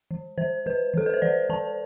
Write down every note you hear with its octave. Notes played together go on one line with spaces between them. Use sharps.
E3
E3 C5
E3 B4
E3 A4
B4
C5
E3 D5
E3 A5